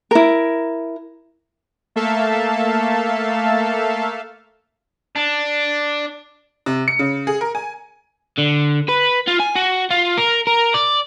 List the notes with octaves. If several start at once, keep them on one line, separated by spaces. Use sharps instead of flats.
E4 A#4
A3 A#3 A4 E5 F5 A5
D4
C3
C#7
C#3
G#4
A#4
G#5
D3
B4
F4
G#5
F#4
F4
A#4
A#4
D5